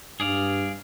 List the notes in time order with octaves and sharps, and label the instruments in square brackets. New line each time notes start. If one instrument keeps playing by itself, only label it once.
[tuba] G2 [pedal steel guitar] G#4 D5 F5